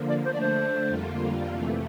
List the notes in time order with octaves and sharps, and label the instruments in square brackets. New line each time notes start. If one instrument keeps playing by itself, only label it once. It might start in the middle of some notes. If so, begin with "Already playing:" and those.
Already playing: [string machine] D3 F3 A#3
[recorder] D5
[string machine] D3 A3 D4 [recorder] C5
[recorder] D5
C5
[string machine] F2 D3 G3 A#3 F4
F2 C3 E3 A3